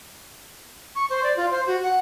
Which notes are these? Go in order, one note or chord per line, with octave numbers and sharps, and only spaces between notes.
C#6
C5
D5
F4
C5
F#4
F#5